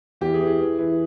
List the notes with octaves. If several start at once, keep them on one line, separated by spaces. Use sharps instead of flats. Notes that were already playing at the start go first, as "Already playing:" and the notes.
E2 G4
G#4
E3
G#4
E3
E3